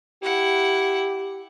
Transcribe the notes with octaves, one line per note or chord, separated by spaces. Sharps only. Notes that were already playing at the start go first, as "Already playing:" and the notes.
E4 G4 F#5